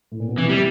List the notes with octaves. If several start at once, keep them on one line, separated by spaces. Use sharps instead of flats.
A2
A#2
B2
C3 E3
G3